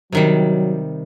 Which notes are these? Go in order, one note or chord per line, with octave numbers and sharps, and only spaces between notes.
C3 D#3 F#3 G3